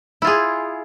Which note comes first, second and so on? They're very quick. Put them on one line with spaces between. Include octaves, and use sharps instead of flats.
E4 F4 G#4